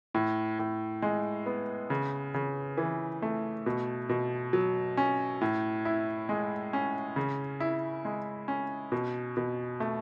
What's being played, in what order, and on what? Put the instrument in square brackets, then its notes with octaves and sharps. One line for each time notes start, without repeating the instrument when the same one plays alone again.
[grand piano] A2
A2
G#3
B3
C#3
C#3
E3
A3
B2
B2
F#3
C#4
A2
E4
G#3
C#4
C#3
E4
G#3
C#4
B2
B2
A3